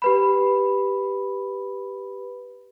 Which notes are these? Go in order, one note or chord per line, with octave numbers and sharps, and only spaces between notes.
G4 B4 B5